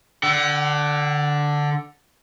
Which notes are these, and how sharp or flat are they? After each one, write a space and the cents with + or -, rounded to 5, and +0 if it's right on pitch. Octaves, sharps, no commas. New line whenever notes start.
D3 +0 F#5 +40